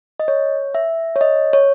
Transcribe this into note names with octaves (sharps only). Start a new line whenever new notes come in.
D#5
C#5
E5
C#5
D#5
C#5